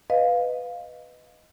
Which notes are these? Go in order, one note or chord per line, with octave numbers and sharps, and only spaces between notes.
B4 D#5 F5